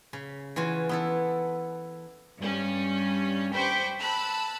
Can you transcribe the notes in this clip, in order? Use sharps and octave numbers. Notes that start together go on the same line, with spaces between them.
C#3
E3 F4 F#4 G#5
B3 E4 A4
G2 G3 C#4
C5 G5 B5 C#6 D6
A5 B5 E6 F#6